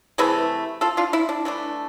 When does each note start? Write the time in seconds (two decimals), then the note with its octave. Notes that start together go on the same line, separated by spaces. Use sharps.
0.18 C3 E3 A3 G#4 B4
0.81 F4 A4
0.97 D4 F4
1.13 E4
1.29 D4
1.45 E3 A3 D4